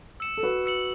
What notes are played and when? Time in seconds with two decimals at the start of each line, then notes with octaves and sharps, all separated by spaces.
0.20 E6 C#7 E7
0.37 A4
0.43 F#4 B4
0.66 E6 C#7 F#7